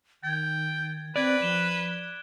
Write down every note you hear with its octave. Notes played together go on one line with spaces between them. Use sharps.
D#3 G5 G#6 A6
C4 B4 D5 F#6 G#6 D7
F3 E7 G7